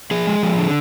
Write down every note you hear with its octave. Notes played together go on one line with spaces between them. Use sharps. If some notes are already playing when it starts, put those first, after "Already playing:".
F3 G#4
G#3
F3
D3